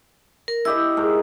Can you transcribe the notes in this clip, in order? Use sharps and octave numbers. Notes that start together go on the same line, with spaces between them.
A#4
E4 G4 D#5 E6
G#2 A#4